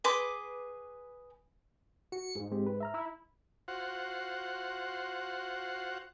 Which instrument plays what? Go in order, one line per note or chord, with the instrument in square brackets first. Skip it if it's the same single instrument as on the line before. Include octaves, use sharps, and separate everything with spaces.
[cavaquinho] G#4 B4 C6 D6
[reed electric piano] F#4 [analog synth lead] C#7
[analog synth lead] G#2
[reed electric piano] G#3 C4 G4
B4
E5 A#5 F6
[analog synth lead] E4
[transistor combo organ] F4 F#4 C5 F#5